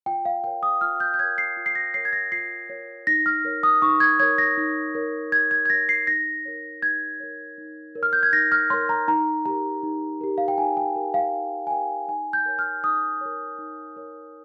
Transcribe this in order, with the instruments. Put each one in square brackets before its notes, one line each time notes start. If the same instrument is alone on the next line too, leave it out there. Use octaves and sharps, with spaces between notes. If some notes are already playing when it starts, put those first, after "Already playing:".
[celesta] F4 G5
F5
A#4 C#5 G5
D#6
F4 F6
G6
G6
C#5 G#6
A#4
C7
F4
C7
A#6
A#4 C#5 C7
G#6
A#6
F4 C7
A#4 C#5
D#4 A#6
F6
A#4 C#5
D#6
D#4 C#6
G#6
C#5 G#6
A#4
A#6
D#4
A#4 C#5
D#4 G#6
G#6
G#6
A#4 A#6
C#5
C7
D#4 A#6
A#4 C#5
D#4 G#6
A#4 C#5
D#4
A#4 C#5
F6
G6
G#6
D#4 A#6
F6
C#5 C6
A#4
A#5
D#4 A#5
G4 A#4 A#5
D#4
G4 A#4
F5
G5
D#4 G#5
G5
G4 A#4
F5
D#4
G#5
G4 A#4 G5
D#4 G#5
G6
A#4 C#5
F6
D#4 D#6
A#4 C#5
D#4
A#4 C#5